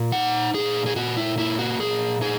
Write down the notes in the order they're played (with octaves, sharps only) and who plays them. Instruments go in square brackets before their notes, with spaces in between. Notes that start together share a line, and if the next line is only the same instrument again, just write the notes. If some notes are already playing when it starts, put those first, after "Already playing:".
Already playing: [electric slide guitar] A#2
D#4 F#5
A#2 G#4
G#4
A#2 F#4
E4
A#3 E4
F#4
A#2 G#4
D#4 G#4